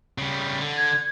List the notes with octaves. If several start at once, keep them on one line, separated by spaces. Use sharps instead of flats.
C#3 G3
D3
G#6